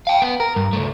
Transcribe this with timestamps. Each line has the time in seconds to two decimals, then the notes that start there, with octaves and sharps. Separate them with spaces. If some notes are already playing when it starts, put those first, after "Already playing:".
0.07 F5 G5
0.22 B3
0.40 A#4
0.56 G2
0.73 C#2 A3